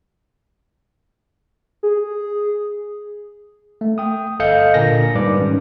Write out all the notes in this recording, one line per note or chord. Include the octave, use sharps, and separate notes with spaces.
G#4
A3
G5 D#6
G1 A4 D#5 F5 G6 C#7
A#2 D3 A#4 G#5 A#6
G#2 G3 B4 D5 D6
D#3 C#4